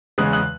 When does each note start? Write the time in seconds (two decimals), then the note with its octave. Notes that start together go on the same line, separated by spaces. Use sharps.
0.18 E2 C#3 G#3 D#6 F#6
0.33 D#6 F#6